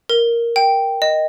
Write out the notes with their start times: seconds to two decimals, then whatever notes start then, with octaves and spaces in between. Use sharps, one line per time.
0.09 A#4
0.56 G5
1.02 D#5